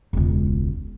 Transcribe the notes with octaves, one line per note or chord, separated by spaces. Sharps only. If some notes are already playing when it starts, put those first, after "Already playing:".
E1 C#2